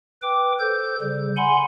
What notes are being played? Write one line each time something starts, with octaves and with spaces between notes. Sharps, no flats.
B4 G5 D6
A4 C5 G6
C#3 G3
F#5 G#5 B5 C6